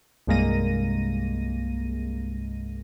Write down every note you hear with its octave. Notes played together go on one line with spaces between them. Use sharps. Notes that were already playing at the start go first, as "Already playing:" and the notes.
C2 G2 G#3 A#3 A#6 D#7